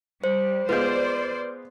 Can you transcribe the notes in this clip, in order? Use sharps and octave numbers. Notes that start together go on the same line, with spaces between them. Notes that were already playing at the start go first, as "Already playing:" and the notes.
G3 C5
G#3 B3 F4 B4 C5 D5 G6